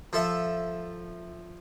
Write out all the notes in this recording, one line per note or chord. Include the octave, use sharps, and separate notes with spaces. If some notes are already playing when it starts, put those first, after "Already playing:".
F3 A4 E5